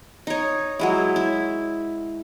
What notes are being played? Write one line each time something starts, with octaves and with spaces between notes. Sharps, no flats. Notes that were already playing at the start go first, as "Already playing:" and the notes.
D#4 C#5
F#3 G#3 E4
E4